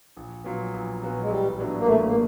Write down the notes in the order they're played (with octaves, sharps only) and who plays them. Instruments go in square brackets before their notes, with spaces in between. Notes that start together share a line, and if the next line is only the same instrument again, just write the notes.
[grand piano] A#1
A#2 F#3 B3
A#1
A#2 F#3 B3
[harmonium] G#3
[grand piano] A1 [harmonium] G3
[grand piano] A2 F#3 B3 D4
[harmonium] A#3
[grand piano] A1 [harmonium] A3
[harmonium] A#3